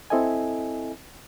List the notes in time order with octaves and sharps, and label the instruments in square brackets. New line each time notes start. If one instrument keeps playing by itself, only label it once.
[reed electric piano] C4 E4 A4 D#5 E5 G#5